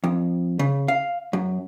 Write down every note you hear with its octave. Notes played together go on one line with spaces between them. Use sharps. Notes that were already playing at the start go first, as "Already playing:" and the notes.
F2
C#3
F5
F#2